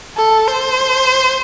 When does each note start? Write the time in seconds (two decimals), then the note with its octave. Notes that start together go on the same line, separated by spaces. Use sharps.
0.17 A4
0.48 C5